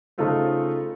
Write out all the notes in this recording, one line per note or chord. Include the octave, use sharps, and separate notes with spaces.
C#3 A3 D#4 F4 A4 C5